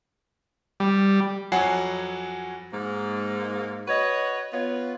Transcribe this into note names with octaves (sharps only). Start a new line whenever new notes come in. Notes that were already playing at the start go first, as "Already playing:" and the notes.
G3
F2 F#3 F#5 G#5 C7
G#2 A#3
F#4 B4 C#5 D#5
B3 F4 C#5